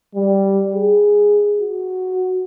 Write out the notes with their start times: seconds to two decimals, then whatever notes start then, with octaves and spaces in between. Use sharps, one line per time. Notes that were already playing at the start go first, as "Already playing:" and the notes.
0.15 G3
0.75 G#4
1.60 F#4